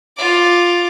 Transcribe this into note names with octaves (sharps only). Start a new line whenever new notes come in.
F4 D6